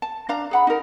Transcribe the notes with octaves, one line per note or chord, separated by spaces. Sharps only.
A5
D4 F5 A#5
G#4 F#5 B5
D#4 A#4